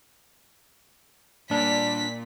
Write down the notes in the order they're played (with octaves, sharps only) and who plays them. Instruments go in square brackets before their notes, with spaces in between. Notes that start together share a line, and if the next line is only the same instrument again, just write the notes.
[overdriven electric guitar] A#2 [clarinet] G3 [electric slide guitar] D4 [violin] B6